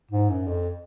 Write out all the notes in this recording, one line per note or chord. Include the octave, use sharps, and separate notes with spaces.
G#2
F#2
F2